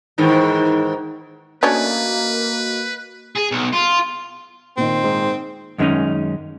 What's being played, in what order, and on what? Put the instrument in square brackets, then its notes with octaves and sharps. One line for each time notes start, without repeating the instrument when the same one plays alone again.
[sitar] G#2 D#3 E3
[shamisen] A3 C#4 D4 [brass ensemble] A#3 [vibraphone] F#4 D#5 [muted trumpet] B4
[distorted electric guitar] G#4
B1
F4
[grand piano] A#2 D#3 [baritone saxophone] C4
[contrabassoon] G#2
[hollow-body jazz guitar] F#2 D#3 G#3 A3 C#4 D#4